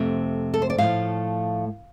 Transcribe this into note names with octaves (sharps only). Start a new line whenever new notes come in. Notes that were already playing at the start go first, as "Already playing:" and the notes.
Already playing: F2 C3 A3
A4
C5
D5
A2 F3 A3 F5